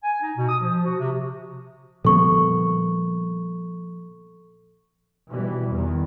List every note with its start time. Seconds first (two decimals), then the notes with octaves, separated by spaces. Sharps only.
0.03 G#5
0.21 D#4
0.36 B2
0.49 D#6
0.60 F3
0.85 F#4
0.99 C3
2.05 A#2 D3 F3 G3 A#3 B3 A4 C#6
5.31 B2 E3 G3
5.71 E2 D#3